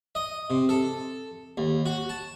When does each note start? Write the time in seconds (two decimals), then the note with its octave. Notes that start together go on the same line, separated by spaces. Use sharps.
0.15 D#5
0.50 C3
0.69 A4
1.57 D#2
1.86 F#4
2.09 A5